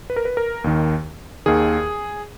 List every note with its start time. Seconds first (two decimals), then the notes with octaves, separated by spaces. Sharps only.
0.10 B4
0.16 A#4
0.25 B4
0.37 A#4
0.64 D#2 D#3
1.46 D#2 D#3 G#4